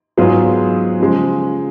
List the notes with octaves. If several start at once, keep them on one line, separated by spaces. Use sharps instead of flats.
G#2 F#3 B3 F4 G#4
C#3 F3 G#3